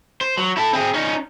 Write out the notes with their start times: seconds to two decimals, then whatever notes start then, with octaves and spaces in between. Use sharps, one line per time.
0.21 C5
0.37 F#3
0.57 E4 A4
0.73 C4 G#4
0.94 C#4 D#4